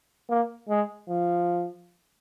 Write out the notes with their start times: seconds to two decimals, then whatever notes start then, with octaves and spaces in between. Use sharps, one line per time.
0.29 A#3
0.69 G#3
1.09 F3